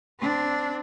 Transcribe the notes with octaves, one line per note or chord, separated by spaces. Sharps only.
C4 D4